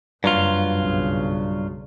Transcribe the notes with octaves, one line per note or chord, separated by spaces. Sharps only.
F#1 G2 F#3 F4
B1 C#3